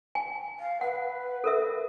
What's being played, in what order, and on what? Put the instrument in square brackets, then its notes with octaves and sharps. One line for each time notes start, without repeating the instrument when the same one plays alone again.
[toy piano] G#5
[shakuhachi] F5
[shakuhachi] B4 [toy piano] F#5
[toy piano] A4 A#4 E5